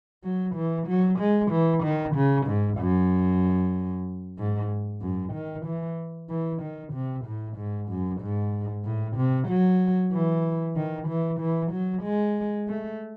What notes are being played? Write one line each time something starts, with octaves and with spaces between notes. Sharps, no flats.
F#3
E3
F#3
G#3
E3
D#3
C#3
G#2
F#2
G#2
F#2
D#3
E3
E3
D#3
C3
A2
G#2
F#2
G#2
A2
C3
F#3
E3
D#3
E3
E3
F#3
G#3
A3